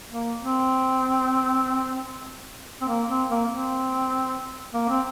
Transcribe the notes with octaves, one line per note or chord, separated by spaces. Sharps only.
A#3
C4
C4
A#3
C4
A#3
C4
A#3
C4